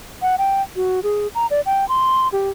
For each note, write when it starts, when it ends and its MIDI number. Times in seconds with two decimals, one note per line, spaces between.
0.22 0.36 78
0.39 0.62 79
0.76 1.00 66
1.03 1.28 68
1.35 1.47 82
1.51 1.61 74
1.66 1.87 79
1.89 2.28 84
2.33 2.50 67